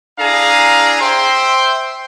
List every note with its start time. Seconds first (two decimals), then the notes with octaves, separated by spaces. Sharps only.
0.18 D4 E4 G#4 F5 A#5
1.00 C5 E5 G5 C6